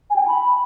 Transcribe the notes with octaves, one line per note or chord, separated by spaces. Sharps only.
G#5
G5
G#5
B5